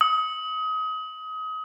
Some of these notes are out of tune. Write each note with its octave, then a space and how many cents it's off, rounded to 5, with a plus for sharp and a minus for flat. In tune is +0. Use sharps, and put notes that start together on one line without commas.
D#6 +30